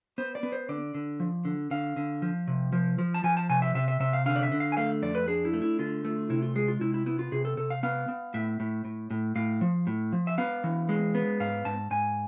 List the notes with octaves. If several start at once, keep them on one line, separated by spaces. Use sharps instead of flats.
B3 C5
D5
B3
C5
D3 D5
D3
F3
D3
D3 F5
D3
F3
C3
F3
F3
A5
F3 G#5
A5
C3 G#5
E5
C3 E5
E5
C3 E5
F5
D3 F5
D5
E5
D3
F5
G#5
A3 F5
F2 D5
B4
D4 G#4
E4
A3
E4
D3 F4
A3
C3 E4
F4
G#3 G#4
F4
C3 E4
E4
B3 E4
F4
C3 G#4
A4
C3 A4
F5
B3 F5
B3
A2 E5
A2
A2
A2
A2 F5
F3
A2
F3
E5
B3 F5
E3
G#3
B3
G#2 F5
G#2 A5
G#2 G#5